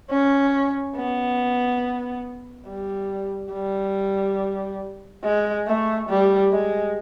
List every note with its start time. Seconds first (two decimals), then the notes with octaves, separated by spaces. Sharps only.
0.10 C#4
0.96 B3
2.67 G3
3.53 G3
5.24 G#3
5.67 A3
6.09 G3
6.52 G#3